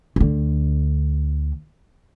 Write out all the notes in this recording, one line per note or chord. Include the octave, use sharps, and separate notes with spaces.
D2 D3